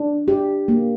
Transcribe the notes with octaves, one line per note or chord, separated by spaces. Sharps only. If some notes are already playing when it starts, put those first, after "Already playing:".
Already playing: D4
G4
A#3